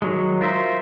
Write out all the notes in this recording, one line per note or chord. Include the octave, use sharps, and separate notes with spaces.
D#3 F#3 G#3
F4 A#4 C5 E5